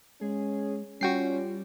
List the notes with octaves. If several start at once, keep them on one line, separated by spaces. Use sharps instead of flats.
G#3 C#4 G#4
G3 C#4 F4 F#4 G5 C7